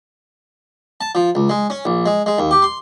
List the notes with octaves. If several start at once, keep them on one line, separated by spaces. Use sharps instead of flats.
A5
F3
C#2
G#3
C#4
A#1
G#3
G#3
D#2
G4
C6